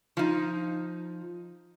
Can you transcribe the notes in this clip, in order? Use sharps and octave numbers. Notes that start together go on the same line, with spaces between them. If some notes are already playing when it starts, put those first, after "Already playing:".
F3 D#4